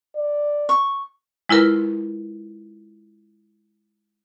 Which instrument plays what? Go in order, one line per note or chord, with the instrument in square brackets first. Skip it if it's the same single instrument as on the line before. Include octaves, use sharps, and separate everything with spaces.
[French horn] D5
[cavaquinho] C#6
[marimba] G#3 E4 F4 A#4 B4